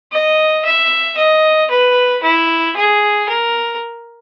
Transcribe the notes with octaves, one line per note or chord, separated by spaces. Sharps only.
D#5
E5
D#5
B4
E4
G#4
A#4